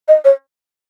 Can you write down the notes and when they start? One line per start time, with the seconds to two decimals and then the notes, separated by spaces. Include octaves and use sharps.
0.08 D#5
0.25 C#5